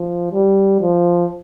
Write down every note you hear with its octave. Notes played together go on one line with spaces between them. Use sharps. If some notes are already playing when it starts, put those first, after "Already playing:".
Already playing: F3
G3
F3